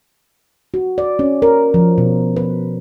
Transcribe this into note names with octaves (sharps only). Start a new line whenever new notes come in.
F#4
D5
C#4
A#4
F3
B2
B4